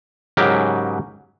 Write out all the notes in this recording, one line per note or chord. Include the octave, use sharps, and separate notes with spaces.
G#2 C#3 F#3 G4 A#4